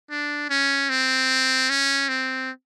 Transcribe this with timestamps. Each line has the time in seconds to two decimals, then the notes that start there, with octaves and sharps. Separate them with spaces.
0.11 D4
0.50 C#4
0.90 C4
1.70 C#4
2.09 C4